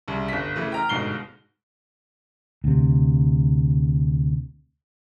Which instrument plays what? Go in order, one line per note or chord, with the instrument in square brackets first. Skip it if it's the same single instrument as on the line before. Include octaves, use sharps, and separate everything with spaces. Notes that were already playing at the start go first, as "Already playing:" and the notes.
[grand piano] C2 C#3
G1 B6
C#3 E3 A3
G5 A#5 F6
G1 G#2 B2 C7 G7
[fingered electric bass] D2 C3